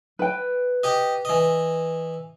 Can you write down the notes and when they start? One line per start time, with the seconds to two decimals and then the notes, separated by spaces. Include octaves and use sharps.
0.19 B4 G5
0.83 G4 D#5
1.25 E3 D#5